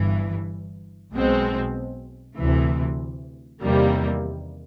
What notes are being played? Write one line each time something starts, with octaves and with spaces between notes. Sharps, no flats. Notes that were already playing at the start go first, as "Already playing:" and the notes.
Already playing: G1 G2 E3
B1 B2 G#3 C4
D2 C3 E3
E2 C3 D#3 G3 A#3